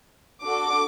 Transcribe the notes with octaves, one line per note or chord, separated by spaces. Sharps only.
D4 F#4 A4 D6